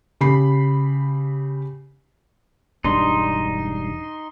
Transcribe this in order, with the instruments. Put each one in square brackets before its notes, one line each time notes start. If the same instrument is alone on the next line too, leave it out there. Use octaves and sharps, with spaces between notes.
[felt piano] C#3 G4 B5 C7
[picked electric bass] E1 G2 D4 [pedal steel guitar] D#4 C6